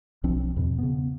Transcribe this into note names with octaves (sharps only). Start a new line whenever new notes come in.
B1 F3 C4 D4
E2 G#2 B2
C#3 B3